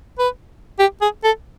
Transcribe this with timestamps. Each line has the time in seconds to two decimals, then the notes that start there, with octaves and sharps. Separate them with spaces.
0.19 B4
0.79 G4
1.01 G#4
1.24 A4